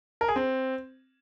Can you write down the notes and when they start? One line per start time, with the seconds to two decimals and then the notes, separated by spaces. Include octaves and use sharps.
0.21 A#4
0.28 G#4
0.36 C4